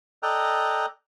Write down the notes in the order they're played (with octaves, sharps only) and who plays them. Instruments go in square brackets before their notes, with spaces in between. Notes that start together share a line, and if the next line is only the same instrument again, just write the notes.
[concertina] A4 D5 D#5 G5 A#5 F#6